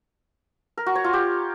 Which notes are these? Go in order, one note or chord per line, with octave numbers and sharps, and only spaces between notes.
A#4
F#4
C#5
F4
G4